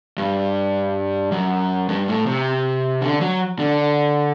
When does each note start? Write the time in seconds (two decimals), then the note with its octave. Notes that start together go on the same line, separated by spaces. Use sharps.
0.18 G2
1.32 F#2
1.89 G2
2.08 A2
2.26 C3
3.02 D3
3.21 F#3
3.59 D3